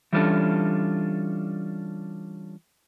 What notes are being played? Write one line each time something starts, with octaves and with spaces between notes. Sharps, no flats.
E3 G3 C#4 D4 F4 A4